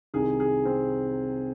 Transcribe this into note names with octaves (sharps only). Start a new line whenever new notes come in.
C2 C3 D#3 G#4
G#4
C4